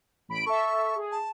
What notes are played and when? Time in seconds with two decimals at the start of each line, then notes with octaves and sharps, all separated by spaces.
0.28 A1 B5 D7
0.46 A4 E5 C#6
0.96 G#4
1.11 A5